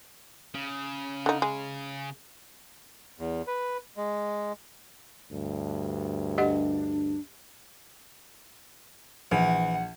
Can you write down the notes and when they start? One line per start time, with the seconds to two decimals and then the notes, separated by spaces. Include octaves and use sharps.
0.55 C#3
1.26 D3 D#4
1.42 G#3
3.19 E2
3.47 B4
3.97 G#3
5.32 D2 G2
6.38 D4 G4 D#5 F#5
9.32 A#1 E3 F#5